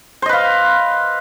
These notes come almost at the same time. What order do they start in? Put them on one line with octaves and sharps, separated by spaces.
C5 D#5 B4 F5